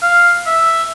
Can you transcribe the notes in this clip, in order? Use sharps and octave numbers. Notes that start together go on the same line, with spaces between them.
F5
E5